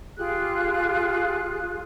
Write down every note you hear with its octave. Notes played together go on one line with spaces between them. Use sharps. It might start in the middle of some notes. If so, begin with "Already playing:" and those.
F4 G4 G#4 F#6